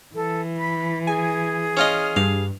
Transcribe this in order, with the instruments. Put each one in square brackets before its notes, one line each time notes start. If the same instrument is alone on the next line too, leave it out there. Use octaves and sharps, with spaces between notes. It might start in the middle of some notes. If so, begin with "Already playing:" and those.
[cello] E3 [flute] A4
[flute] B5
[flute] G#4 [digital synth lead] G#5
[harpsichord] C#4 F4 D#5 [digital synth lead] F6
[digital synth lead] G2 [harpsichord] F5